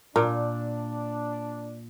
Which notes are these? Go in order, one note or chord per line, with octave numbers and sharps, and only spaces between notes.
A#2 D4 A#4